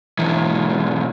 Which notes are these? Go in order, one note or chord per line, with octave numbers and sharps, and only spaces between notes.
B1 E3